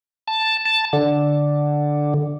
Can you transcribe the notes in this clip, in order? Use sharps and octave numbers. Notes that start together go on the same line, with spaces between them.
A5
A5
D3